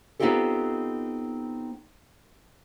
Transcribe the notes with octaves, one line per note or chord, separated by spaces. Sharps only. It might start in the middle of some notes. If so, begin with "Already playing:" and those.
B3 C4 D#4 F4 G4 A4